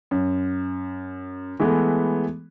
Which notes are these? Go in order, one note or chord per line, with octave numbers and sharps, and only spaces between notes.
F#2
E3 G#3 A3 B3